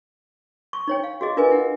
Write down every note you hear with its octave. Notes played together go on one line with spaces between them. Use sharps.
C#6
D#4 C#5 G5
F5
F#4 G#4 D#5
D4 F4 A#4 B4 D#5 G#5
E4 F#5